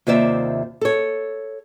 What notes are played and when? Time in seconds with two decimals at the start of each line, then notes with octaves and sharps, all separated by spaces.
0.07 D#2 C3 F4 C5 D5 E5
0.81 A4 C#5